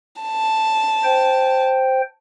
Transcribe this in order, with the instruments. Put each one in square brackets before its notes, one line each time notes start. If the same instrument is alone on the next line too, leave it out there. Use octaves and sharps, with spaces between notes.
[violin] A5
[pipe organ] C5 G5